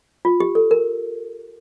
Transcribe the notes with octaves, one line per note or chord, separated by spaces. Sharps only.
F4
G4
A4
A#4